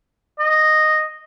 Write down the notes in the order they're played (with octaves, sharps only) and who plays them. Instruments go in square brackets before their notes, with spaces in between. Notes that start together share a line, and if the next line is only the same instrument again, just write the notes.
[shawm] D#5